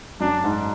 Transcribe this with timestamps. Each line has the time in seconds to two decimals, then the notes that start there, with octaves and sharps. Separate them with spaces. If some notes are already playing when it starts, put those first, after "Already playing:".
0.20 F#2 D4
0.44 G#2